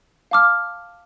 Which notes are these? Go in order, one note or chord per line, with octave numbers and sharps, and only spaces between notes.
F5 A5 D6 F6